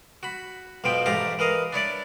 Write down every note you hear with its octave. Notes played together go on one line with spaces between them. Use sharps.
F#4 B5
B1 F2 B2 F3 G5
A1 G#2 A3 G4 F5 A#5
E3 A#4 D#5 F5
D4 E4 C#5 D5